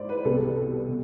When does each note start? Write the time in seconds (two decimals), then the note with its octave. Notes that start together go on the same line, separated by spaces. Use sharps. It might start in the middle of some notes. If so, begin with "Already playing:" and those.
Already playing: G#2 E4 C5 D5
0.09 B4
0.25 C2 B2 A4
0.88 B2